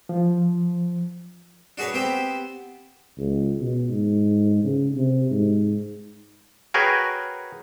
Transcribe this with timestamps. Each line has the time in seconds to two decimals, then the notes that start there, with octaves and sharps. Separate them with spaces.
0.09 F3
1.78 D4 F#4 G#4 B4 C#5
1.94 B3 C4 G4 C5
3.18 C#2
3.60 B2
3.90 G#2
4.65 C#3
4.95 C3
5.31 G#2
6.74 F#4 G#4 A#4 B4 C#5 G5